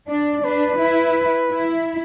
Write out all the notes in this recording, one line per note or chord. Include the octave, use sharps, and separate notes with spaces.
D4 D5
D4 B4
E4
E4